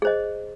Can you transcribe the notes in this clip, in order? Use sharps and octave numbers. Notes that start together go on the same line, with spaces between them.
G#4 C5 D#5